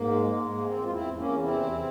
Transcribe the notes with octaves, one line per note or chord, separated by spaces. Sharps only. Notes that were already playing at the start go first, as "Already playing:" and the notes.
Already playing: G#2 A#3
G#3
G#3
G#2
A#3
E2 C4
E2 F4
C4 E4
E2
A#3 C#4
E2
C3 C4 E4
E2